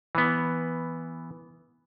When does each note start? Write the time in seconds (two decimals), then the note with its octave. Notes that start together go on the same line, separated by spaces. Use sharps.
0.15 E3 B3